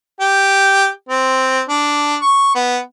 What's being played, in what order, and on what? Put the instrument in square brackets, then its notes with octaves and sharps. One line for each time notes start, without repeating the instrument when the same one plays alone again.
[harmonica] G4
C4
D4
C#6
B3